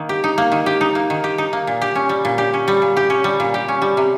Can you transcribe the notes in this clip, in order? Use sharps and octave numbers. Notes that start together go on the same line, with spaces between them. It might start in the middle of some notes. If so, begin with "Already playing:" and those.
Already playing: D#3 A#3
G4
D#4
A#3
D#3
G4
D#4
A#3
D#3
G4
D#4
A#3
A#2
G4
C#4
G3
A#2
G4
C#4
G3
A#2
G4
C#4
G3
A#2
G4
C#4
G3
C3